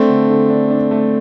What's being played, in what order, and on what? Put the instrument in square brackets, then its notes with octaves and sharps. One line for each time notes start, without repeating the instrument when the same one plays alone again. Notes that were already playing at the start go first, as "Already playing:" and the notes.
Already playing: [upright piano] A3 C4 [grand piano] D4
[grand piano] D3
D3
D4
D4
A3